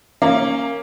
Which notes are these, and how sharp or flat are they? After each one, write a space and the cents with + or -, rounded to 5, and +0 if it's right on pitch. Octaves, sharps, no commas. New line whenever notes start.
A#3 +0 C#4 +0